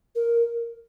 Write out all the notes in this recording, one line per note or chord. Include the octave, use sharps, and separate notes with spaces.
A#4